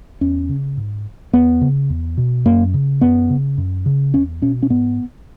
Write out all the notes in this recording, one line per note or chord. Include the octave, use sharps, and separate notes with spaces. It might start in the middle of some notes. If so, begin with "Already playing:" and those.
E2 C#4
C#3
G#2
E2 B3
C#3
E2
B2
F#2 A#3
C#3
F#2 B3
C#3
F#2
C#3
E2 C#4
B2 C#4
C#4
G#2 B3